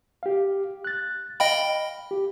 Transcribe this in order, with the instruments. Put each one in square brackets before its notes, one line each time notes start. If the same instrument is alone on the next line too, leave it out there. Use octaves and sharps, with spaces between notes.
[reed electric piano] G4 F5
F#6 A6
[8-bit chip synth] D#5 G5 B5 [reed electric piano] F5
[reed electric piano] G4